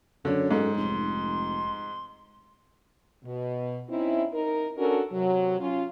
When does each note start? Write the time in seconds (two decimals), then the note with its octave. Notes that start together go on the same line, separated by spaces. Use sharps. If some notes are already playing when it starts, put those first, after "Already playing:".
0.25 F#2 D3 C#5
0.51 G#2 A4
0.77 F1 C6
3.25 B2
3.90 C4 C#4 D#4 E4
4.34 D#4 A#4
4.78 C#4 D4 F#4 A4 A#4
5.13 C3 F#3
5.60 C#4 F4